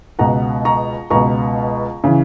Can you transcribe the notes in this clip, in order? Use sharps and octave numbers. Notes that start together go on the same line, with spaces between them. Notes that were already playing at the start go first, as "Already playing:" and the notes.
C#2 B2 F#5 A#5
A#5 C#6
C#2 B2 A#5 C#6
C#3 E3